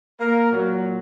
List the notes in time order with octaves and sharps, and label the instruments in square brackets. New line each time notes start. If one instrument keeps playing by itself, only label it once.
[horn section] A#3 A#4
A#2 F#3